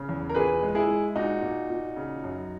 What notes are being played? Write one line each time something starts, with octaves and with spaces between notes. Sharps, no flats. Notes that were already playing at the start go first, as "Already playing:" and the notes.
Already playing: C#3
E2
A#4
A#2 G#4 B4
G#3
E4 G#4
G#3
A#2 D#4 F#4
A#2
A#2
C#3
F#2